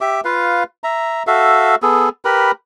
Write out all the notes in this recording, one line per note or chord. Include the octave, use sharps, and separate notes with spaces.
G4 E5 D6
F4 B4 F5
E5 A#5
F#4 A4 E5 F5
B3 G#4 A4
G4 A#4 B4 B5